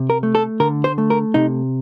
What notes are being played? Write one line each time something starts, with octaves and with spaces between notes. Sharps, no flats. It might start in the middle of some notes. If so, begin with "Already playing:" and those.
Already playing: C3
A#4
A3
A4
D3 A#4
C5
A3
A#4
C3 D#4